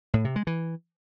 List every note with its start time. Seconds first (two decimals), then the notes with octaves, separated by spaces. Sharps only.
0.14 A2
0.25 C3
0.36 G#3
0.47 E3